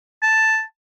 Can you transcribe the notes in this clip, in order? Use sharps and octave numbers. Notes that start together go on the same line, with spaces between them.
A5